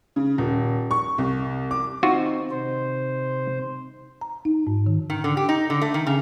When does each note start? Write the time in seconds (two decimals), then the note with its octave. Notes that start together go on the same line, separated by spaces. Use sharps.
0.16 C#3
0.38 D#1
0.91 C#6
1.18 C2
1.71 D6
2.03 C4 D#4 F4 F#4 E5
2.51 C3 C5
4.21 A#5
4.45 D#4
4.67 G#2
4.86 D#3
5.10 D#3
5.24 D3
5.37 G4
5.49 D#4
5.70 D3
5.82 A3
5.94 D#3
6.07 C#3